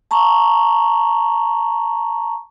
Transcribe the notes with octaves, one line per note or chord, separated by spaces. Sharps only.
A5 A#5 C#6